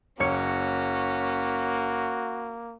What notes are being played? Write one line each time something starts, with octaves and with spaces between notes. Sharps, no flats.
F#1 A#3 C#4 F#4 C#5 C#7